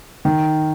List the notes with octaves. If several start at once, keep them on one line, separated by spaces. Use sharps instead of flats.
D#3